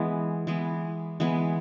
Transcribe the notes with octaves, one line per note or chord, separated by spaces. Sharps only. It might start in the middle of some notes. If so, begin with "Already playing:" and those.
Already playing: E3 G#3 B3
E3 G#3 B3
E3 G#3 B3